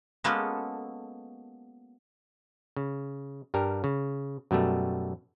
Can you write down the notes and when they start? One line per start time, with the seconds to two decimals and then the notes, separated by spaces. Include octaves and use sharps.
0.24 G#3 A#3 B3 C#4 F#4 A4
2.76 C#3
3.54 G2 G3 A#4
3.84 C#3
4.51 F#2 B2 G3 A3